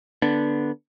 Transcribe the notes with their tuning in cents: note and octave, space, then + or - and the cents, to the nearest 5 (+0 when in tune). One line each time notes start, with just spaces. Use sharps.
D3 +0 B3 -10 D4 +0